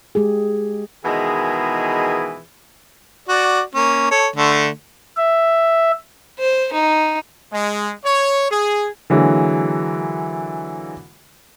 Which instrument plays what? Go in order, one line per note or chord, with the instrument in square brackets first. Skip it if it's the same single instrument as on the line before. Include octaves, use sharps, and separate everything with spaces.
[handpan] G#3 G4 G#4
[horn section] B2 D#3 E3 G#3 G#4
[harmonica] F#4 D5
A#3 C#4
A4 C#5
D3 A3
[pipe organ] E5
[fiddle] C5
D#4
[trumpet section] G#3
C#5
G#4
[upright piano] D3 E3 F#3 G#3 A#3